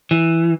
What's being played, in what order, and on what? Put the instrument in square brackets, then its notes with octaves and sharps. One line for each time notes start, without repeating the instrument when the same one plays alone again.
[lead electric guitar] E3